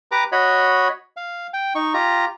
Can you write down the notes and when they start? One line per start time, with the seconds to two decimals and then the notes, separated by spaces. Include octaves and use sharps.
0.11 G4 B4 A#5 D6
0.32 F#4 C#5 D#5 B5
1.17 F5
1.53 G5
1.75 D#4 C#6
1.94 F4 G4 A#5